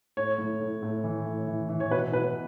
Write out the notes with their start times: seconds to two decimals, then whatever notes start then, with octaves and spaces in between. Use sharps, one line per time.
0.17 A2 C#5
0.38 A2
0.61 A2
0.83 A2
1.04 E3
1.26 A2
1.47 E3
1.69 E3
1.80 C#5
1.91 B2 B4
2.12 B2 B4